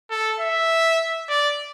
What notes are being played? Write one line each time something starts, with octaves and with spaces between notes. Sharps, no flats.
A4
E5
D5